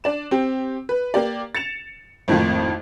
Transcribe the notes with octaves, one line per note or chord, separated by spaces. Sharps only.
D4 D5 E7
C4 G4
B4
A#3 G4 D5
A6 C#7 E7 F7
G#1 F2 A2 D#3 F3